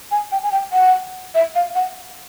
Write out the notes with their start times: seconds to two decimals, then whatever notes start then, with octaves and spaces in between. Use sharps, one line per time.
0.11 G#5
0.32 G5
0.43 G#5
0.52 G5
0.72 F#5
1.35 E5
1.55 F5
1.75 F#5